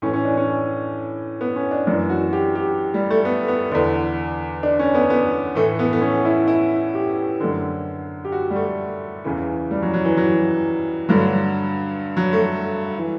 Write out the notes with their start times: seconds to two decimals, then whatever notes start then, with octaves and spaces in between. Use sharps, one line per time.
0.02 A2 E3 C#4
0.13 C#4
0.25 D4
0.37 C#4
1.41 B3
1.56 C#4
1.71 D4
1.87 F#2 E3 D4
2.10 F#4
2.33 G4
2.55 G4
2.94 G3
3.10 A3
3.25 B3
3.48 B3
3.71 E2 D3 D4
4.63 D4
4.79 C#4
4.95 B3
5.10 B3
5.55 A2 E3 A3
5.79 B3
5.93 B3
6.01 C#4
6.25 E4
6.48 E4
6.94 G4
7.40 F#2 D3
8.25 G4
8.32 F#4
8.50 G3
8.56 A3
9.24 E2 C#3 E3
9.71 G3
9.82 F#3
9.94 F#3
10.05 E3
10.17 F#3
11.09 G2 D3 F#3
12.17 F#3
12.33 A3
12.98 E3